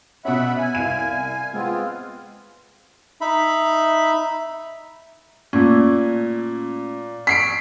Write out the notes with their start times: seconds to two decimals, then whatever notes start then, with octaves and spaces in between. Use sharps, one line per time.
0.25 B2 C#4 E5 F#5 B5
0.57 G#5
0.75 C2 F5 D#7
1.54 G#3 B3 C4 F4
3.21 D#4 E5 B5
5.53 A#2 A3 C#4
7.27 C#6 B6 C7 D7